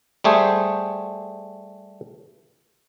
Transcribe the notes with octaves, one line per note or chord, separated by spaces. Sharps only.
G3 A3 G#4 C5